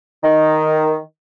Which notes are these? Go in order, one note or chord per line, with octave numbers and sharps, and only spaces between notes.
D#3